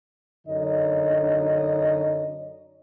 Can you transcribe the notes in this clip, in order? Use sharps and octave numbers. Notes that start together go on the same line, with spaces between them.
F#2 D3 D4 D#4 C#5 D#5